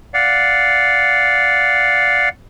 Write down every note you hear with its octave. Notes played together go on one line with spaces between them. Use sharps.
D5 F5 F#5